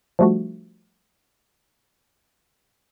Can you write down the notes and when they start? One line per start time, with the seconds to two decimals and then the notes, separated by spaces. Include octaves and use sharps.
0.19 F3 G3 A3 D4 F#4